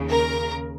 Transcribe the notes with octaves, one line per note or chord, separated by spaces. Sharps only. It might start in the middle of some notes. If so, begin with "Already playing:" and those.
Already playing: D#2 C#3
A#4